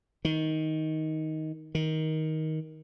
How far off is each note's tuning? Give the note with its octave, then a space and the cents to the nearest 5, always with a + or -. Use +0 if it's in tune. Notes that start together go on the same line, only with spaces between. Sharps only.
D#3 +10
D#3 +15